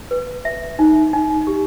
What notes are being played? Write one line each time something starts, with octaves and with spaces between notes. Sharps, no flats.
B4
E5
D#4
D#4
G4